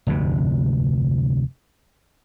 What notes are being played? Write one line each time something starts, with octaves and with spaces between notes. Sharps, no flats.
F1 D2 G2 C3